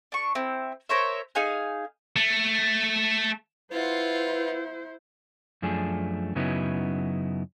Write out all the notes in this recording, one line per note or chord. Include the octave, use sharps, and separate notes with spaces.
D4 C#6
C4 E4
A#4 C5 C#5 E5
D#4 G#4 F5 G#5
A3
E4 F4 B4 C5 F#5
F#2 F3 A3 D4 G#4
F#2 C#3 F#3 B3 D#4 E4